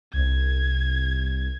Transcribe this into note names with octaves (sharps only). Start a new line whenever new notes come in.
C2 G#6